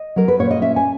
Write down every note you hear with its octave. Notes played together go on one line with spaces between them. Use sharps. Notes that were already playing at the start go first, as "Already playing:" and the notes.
Already playing: D#5
F#3 A#4
B4
A#2 C#5
D#5
C#4 E5
G#5